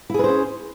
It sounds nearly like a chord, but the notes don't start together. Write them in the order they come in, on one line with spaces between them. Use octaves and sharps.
E4 G#4 B4 C5 C#4